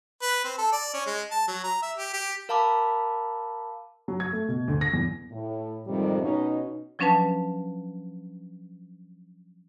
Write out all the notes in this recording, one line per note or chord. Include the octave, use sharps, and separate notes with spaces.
B4
C4
A4
D5
C#4
G#3
A5
F#3
A#5
E5
G4
G4
A#4 F5 A5 B5 D6
F#3
G#6
A3
B2
D2
A#6
E2
A2
F2 G#2 C3 D#3 G3
B2 C#4 D#4
F3 F#3 C#4 D4 B4 A5